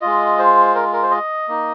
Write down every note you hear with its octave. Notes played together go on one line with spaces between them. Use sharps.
G#3 F4 D#5
C5
A#4
A#4
C5
D#5
A#3 D#4